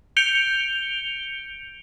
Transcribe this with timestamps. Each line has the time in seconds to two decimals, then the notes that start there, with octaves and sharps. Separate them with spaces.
0.17 G6 C#7 D7 F7 G7